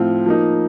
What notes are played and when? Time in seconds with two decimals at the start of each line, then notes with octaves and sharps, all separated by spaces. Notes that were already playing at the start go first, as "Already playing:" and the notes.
Already playing: A2 F3 C4 F4
0.26 F3 A#3 D#4